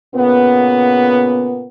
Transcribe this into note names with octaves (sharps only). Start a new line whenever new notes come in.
A#2 C#3 B3